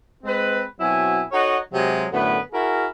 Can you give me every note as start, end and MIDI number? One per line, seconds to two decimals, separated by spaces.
0.24 0.62 56
0.24 0.62 60
0.24 0.62 71
0.80 1.22 47
0.80 1.22 54
0.80 1.22 60
0.80 1.22 64
0.80 1.22 80
1.32 1.57 63
1.32 1.57 66
1.32 1.57 69
1.32 1.57 73
1.32 1.57 75
1.32 1.57 78
1.72 2.05 48
1.72 2.05 54
1.72 2.05 56
2.12 2.38 42
2.12 2.38 45
2.12 2.38 50
2.12 2.38 59
2.12 2.38 71
2.52 2.86 64
2.52 2.86 66
2.52 2.86 68
2.52 2.86 70